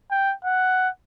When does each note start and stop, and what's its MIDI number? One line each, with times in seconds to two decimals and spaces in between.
0.11 0.34 79
0.45 0.89 78